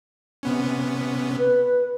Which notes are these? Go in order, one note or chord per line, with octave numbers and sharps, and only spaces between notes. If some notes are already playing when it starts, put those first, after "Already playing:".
C3 B3 C#4
B4